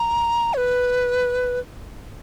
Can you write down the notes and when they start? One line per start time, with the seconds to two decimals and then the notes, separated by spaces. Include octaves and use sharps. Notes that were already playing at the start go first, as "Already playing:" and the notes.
Already playing: A#5
0.54 C#5
0.57 B4